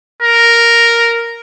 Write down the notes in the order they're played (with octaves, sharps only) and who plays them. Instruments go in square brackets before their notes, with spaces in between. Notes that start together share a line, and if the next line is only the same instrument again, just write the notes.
[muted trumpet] A#4